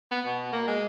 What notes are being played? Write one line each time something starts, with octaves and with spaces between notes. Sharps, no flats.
B3
B2
A#3
G#3